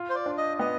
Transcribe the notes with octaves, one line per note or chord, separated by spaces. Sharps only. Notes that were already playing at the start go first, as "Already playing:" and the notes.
Already playing: F4
C5
D5
D4
D#5
B3 D#5